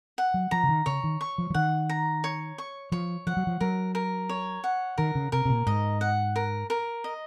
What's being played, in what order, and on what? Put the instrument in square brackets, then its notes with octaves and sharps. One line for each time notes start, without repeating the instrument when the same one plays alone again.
[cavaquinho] F#5
[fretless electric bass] F#3
[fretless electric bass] F3 [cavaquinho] A#5
[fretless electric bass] C#3
D#3
[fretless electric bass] C#3 [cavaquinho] C#5
[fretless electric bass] D#3
[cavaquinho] C#6
[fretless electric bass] F3
F3
[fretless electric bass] D#3 [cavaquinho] F#5
[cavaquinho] A#5
C#5
C#6
[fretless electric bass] F3 [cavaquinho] C#5
[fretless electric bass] F3 [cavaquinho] F#5
[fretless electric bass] F#3
F3
[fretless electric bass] F#3 [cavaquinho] A#4
[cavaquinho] A#4
C#5
F#5
[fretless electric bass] D#3 [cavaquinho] A#4
[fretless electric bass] C#3
[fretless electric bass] C3 [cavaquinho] A#4
[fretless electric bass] C3
A#2
[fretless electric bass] G#2 [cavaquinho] D#5
[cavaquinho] F#5
A#4
A#4
D#5